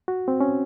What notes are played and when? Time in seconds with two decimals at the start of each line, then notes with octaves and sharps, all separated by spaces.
0.08 F#4
0.28 C4
0.41 C#4